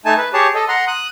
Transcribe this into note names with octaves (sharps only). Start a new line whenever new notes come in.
A3 D#4 G#5 A5
B4
G4 G#4 C#5 A5
A4 D#5
F#5 A#5 C6
D#6 F#6